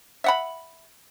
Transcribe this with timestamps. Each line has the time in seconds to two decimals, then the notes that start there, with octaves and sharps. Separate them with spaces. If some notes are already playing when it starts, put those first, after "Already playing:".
0.24 E5 F#5 B5